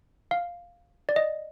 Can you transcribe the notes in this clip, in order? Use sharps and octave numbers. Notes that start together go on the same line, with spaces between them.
F5
D5
D#5